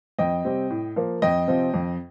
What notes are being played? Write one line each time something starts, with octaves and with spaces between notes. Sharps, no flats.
F2 D#5 G5
C3 G3 C4
A2
F3 A#3
F2 D#5 G5
C3 F3 C4
F2